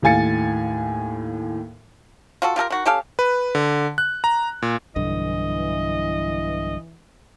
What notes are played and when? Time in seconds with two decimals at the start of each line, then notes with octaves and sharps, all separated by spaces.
0.02 D#2 A2 F5 G#5 A6 C#7
2.42 F4 F#4 A4
2.56 F4 G4 A4 A#4
2.70 D#3 F#4
2.86 C#4 G4 A4 F5
3.19 B4
3.55 D3
3.98 F#6
4.24 A#5
4.62 A#2
4.96 B1 G2 D3 E3 D#5